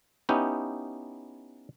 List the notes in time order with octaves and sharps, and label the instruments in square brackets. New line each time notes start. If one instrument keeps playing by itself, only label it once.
[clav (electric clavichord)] B3 C#4 D#4 E4 G4